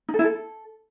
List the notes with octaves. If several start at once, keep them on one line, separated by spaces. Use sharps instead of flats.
D#4
A4
E4
A4